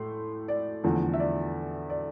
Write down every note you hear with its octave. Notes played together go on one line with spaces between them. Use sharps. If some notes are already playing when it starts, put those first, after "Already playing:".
Already playing: A2 A3 C6
D5
E2 D3 F3 A3
E5
D5
D5